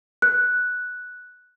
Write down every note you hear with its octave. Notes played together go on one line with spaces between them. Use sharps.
F#6